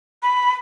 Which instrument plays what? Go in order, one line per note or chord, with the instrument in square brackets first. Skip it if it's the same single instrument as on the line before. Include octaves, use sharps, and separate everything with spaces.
[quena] B5